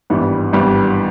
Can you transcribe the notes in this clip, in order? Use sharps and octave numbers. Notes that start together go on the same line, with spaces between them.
G#1 G2 E3 G3 B3
G#1 G2 E3 G3 B3